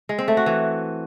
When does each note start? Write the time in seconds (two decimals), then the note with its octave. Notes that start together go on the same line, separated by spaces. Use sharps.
0.09 G#3
0.18 C4
0.28 A3
0.37 F#4
0.46 E3